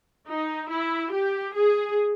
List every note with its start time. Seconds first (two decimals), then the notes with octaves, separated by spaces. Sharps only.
0.28 D#4
0.71 E4
1.13 G4
1.56 G#4